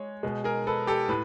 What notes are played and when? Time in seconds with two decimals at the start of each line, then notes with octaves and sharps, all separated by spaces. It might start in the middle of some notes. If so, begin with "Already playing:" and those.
Already playing: G#3 C#5
0.23 B2 G#3
0.44 G#4 A#4
0.67 A4 B4
0.87 G4 A4
1.09 A2 B4